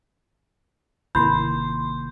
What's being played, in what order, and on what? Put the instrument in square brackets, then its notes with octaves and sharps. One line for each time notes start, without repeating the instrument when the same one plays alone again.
[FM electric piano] G#1 C6 [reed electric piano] C3 D#3 A#3 [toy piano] E4 B5 [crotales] G6